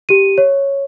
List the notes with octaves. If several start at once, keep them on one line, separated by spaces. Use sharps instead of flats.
G4 D#7
C#5